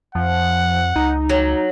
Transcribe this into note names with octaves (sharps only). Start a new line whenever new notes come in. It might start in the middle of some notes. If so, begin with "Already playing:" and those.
F2 F3 F#5
C#2 D#4
F#3